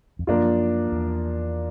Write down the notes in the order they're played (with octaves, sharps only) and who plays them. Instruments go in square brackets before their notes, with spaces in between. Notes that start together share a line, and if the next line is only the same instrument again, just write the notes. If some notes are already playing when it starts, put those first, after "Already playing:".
[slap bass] F2
[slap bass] F#2 [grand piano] F3 A#3 D4 F4
[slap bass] E2